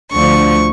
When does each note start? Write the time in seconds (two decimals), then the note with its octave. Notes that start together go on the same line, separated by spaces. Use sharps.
0.12 D2 D3 F3 C#6